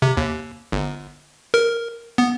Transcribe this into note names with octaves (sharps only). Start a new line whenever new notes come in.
C3
D#2
G1
A#4
B3